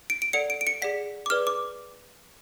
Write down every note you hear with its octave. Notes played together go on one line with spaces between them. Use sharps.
D7
D7
A4 D5 F#5 C#7
D7
D7
C#7
G#4 D5 F#5 B6
D6
G#4 B4 D5 F6
D6